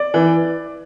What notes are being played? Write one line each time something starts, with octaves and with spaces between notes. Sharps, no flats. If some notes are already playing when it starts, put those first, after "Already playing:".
Already playing: D5
E3